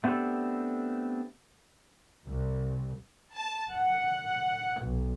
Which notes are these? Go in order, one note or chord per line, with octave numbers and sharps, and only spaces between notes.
A3 B3 C4 D4 G4 A4
C2
A5
F#5
B1